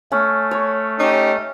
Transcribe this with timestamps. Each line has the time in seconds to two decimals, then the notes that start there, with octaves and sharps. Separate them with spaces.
0.12 A3 C#4
0.51 C#5
0.99 C#4 D#4 G4